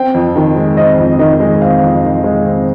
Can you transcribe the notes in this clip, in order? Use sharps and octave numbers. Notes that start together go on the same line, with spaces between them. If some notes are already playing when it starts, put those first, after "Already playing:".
Already playing: C4 G5
F2
D#3
G#3
C4 D#5
F2
D#3 D#5
G#3
C4 F5
F2
D#3
G#3
C4